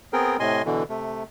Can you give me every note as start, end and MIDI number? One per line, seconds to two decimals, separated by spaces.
0.13 0.37 59
0.13 0.37 60
0.13 0.37 68
0.13 0.37 70
0.13 0.37 79
0.40 0.62 45
0.40 0.62 48
0.40 0.62 75
0.40 0.62 80
0.40 0.62 84
0.65 0.83 47
0.65 0.83 50
0.65 0.83 52
0.90 1.23 48
0.90 1.23 57